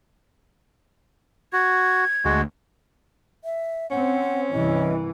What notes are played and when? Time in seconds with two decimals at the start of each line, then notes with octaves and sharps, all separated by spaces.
1.53 F#4 G#6
2.25 D2 G#3 F#4
3.44 E5
3.91 C4 C#4 F#5
4.53 C2 G2 E3 D#5